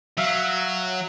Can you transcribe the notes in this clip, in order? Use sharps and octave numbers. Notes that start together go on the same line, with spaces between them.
F#3 E5 F5